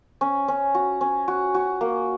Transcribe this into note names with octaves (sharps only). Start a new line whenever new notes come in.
C#4
C#4
F#4
C#4
F#4
F#4
A#3